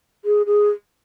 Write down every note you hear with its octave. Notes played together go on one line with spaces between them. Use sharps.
G#4
G#4